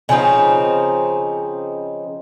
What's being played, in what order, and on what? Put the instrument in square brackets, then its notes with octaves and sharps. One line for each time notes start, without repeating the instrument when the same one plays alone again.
[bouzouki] C#3 F3 C4 D#4